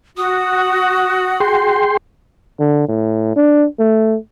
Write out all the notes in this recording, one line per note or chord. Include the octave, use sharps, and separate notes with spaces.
F#4 D#6
G#4 G5 C6
D3
A2
D4
A3